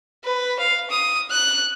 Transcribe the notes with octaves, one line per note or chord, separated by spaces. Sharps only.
B4
F5
D#6
F#6